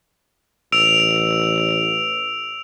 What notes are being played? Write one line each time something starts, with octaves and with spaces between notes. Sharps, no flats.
A1 E6 D7 F7